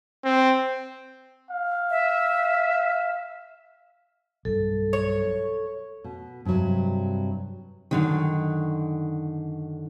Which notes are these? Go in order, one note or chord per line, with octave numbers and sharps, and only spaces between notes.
C4
F5
E5
B1 G2 A4
C#5
B2
G2 C3 D#3 F#3
F#2 D3 D#3